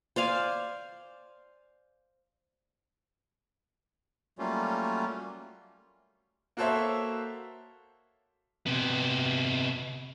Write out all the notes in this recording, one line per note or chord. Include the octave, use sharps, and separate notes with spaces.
C5 D5 F5 G#5
F#3 G3 A3 A#3 C#4 F4
A#3 F#4 A4 C5 C#5 E5
C3 B3